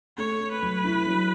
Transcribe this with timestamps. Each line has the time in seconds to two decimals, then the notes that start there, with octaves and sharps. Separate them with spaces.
0.17 A3 C#5
0.40 A3
0.51 B4
0.62 F#3
0.84 E4
1.06 F#3